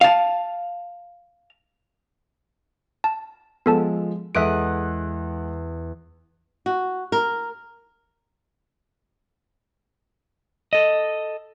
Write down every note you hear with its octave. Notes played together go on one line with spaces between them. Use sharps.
F5 A5
A5
F3 G#3 B3 A4 A5
E2 G#3 A4 E5 F#5 D#6 F#6 D7
F#4
A#4
A4 D#5